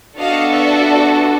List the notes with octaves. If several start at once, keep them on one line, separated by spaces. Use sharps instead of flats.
B3 D4 F#4 A4 D#5 F5
D5 E5